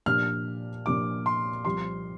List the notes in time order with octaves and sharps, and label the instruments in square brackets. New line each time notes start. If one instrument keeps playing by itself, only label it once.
[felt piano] A#2 F3 D4 G4 [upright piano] F6
[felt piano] A#2 F3 D4 G4 [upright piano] D6
[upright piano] C6
[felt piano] C2 C3 F3 C4 G4 [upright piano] C6